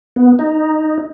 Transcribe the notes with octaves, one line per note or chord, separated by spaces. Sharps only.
B3
D#4